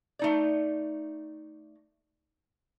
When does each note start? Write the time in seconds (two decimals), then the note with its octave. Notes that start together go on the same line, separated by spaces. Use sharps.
0.19 A3 D#4 D5